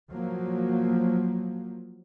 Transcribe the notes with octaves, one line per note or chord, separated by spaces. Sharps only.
F3 F#3 A#3